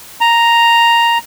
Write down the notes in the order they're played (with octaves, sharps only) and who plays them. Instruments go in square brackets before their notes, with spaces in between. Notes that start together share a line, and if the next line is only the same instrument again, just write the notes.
[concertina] A#5